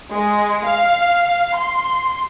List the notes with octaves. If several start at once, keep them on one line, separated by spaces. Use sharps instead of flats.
G#3
F5
C6